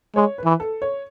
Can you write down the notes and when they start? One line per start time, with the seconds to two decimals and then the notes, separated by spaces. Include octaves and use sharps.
0.16 G#3 C#5
0.38 B4
0.45 E3
0.60 A4
0.82 C#5